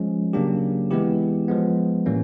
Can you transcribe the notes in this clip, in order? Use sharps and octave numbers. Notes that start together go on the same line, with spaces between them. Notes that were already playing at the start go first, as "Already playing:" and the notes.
Already playing: F3 G#3 C#4
C#3 F#3 A#3 D4 G4
E3 G#3 B3 E4 G4
F3 G#3 B3
A2 E3 G3 A#3 C#4